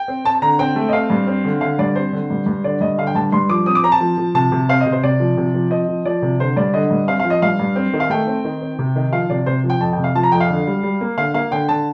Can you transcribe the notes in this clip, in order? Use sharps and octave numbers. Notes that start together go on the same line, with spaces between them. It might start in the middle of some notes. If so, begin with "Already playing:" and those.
Already playing: G5
C4
C4 A5
A5
D3 A#5
C4 G5
A3
D#5
C4 F5
G2
C4
D3
D3 F5
G2 D5
C4 C5
D3
G2
G2
D3 D5
G2 D#5
D3 F5
G5
G2 A5
G2 C6
F3 D6
C4 D#6
D6
C4 A#5
A5
F3
F3
C3 A5
C3
C4 F5
D#5
C3
C5
C3 D5
F3
C3
F3
C4 D#5
F3
F3 D5
C3
D3 C5
G2 D5
D3 D#5
G2
C4 F5
F3 F5
D#5
G2 F5
G2
C4
D#3
F5
A3 G5
C4
D#3
C4
C3
D#3
F3 F5
C3 D5
C3 C5
F3
G5
F2 A5
G5
C3
F5
F3 A5
A#5
F2 G5
F5
D3
G3
G3
A#3
D3 F5
A#3 F5
D3 G5
D3 A5